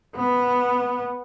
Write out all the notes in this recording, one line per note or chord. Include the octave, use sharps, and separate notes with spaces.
B3